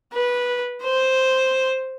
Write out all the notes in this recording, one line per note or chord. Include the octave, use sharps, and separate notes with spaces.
B4
C5